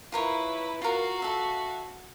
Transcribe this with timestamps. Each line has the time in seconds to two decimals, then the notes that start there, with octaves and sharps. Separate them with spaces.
0.12 E4 F4 A#4 B4 C#5
0.82 F4 F#4 A#4 F5
1.22 A4 E5